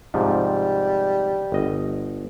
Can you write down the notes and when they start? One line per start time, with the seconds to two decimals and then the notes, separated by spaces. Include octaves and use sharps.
0.14 G#2 C3 F3 G3
1.52 G1 D#5